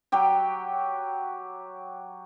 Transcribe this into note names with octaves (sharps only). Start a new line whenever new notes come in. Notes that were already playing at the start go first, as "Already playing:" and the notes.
F#3 G4 G5